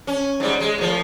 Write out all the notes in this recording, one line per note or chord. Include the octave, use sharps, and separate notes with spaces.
C#4
G#2 G3
G#3
A2 F3